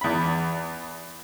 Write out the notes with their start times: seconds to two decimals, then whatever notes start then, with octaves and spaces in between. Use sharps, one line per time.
0.01 E2 B5